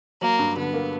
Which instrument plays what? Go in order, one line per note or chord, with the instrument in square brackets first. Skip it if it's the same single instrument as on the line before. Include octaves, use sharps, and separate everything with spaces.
[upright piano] F#3 [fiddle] A#3
[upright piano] G2
[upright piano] D3 [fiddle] B3
[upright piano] A#3